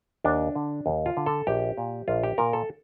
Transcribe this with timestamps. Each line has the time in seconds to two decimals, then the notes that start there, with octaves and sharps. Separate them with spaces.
0.24 D#2 D4
0.55 D3
0.86 D#2
1.06 F4
1.17 D3
1.26 A4
1.47 A#1 G4
1.78 A#2
2.08 A#1 F4
2.23 G4
2.38 A#2 A#4
2.53 A4